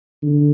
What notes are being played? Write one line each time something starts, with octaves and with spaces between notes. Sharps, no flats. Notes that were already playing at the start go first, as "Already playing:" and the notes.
D3